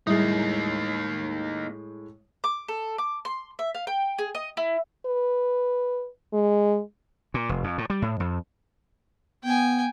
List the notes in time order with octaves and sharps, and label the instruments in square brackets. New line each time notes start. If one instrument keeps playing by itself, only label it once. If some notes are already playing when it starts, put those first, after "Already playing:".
[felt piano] A2 G#3 [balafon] G3 [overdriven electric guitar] A#3 D#4
[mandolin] D6
A4
D6
C6
E5
F5
G5
G#4
D#5
E4
[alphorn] B4
G#3
[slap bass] A#2
F1
F2
A2
G3
A2
F2
[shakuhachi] B3 [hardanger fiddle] G5 G#5